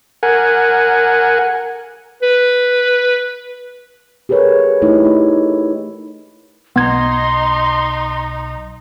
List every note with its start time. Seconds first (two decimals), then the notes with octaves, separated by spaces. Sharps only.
0.23 A#4 F#5 G#5
2.22 B4
4.29 G4 G#4 A#4 B4 C#5
4.82 A3 D#4 E4 G4 C#5
5.05 D#4
6.76 B1 B3 D#4 C6 G#6